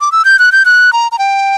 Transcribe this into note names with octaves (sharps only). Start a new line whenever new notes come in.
D6
E6
G6
F#6
G6
F#6
A#5
A#5
G5